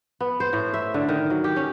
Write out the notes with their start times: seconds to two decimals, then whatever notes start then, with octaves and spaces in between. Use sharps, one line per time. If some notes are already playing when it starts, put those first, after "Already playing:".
0.20 B3
0.40 C5
0.53 A2
0.74 E5
0.94 D3
1.08 D#3
1.30 F#3
1.44 G4
1.56 C#4